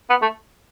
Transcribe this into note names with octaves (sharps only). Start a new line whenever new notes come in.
B3
A3